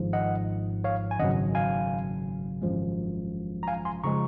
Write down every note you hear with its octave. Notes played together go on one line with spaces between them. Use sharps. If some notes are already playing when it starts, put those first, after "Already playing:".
Already playing: G#1 G#2 F3
D#5 F#5
C#5 F5
G#5
G#1 F#2 C#3 F#3 D#5 F#5
F5 G#5
G#1 F#2 F3 G#3
A#5
F5 G#5
G#5 C6
C#3 F3 G#3 A#5 C#6